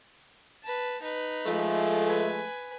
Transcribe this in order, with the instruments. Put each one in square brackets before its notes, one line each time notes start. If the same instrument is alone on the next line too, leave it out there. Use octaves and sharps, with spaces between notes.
[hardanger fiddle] B4 A5
D#4 B4
[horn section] F3 G#3 A3
[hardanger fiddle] B4 G#5